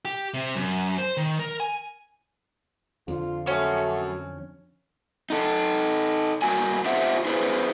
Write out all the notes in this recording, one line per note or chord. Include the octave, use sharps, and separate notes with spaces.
G4
C3
F#2
C5
D#3
A#4
G#5
F2 D3 F4
F#2 A3 C#4 F#4
D#4 A4
G2 A#3 F#4 G#5
F4 G4 C5 E5 F#5
E4 G#4 B4 C5